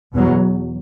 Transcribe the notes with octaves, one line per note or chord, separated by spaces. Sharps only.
E2 B2 F#3